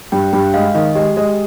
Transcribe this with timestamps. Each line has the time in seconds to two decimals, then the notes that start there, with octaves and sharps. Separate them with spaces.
0.12 G2 G5
0.33 G2 G5
0.54 G#3 F5
0.74 D#3 D#5
0.95 G#3 G4
1.16 G#3 G4